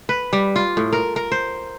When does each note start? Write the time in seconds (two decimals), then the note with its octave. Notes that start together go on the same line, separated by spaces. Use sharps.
0.09 B4
0.33 G3
0.56 F4
0.77 A2
0.93 A#4
1.16 A#4
1.32 C5